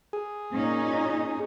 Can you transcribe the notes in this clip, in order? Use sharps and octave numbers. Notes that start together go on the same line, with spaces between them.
G#4
A#2 C#4 D#4